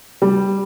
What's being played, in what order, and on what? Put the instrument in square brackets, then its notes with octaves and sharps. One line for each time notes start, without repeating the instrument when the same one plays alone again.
[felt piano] G3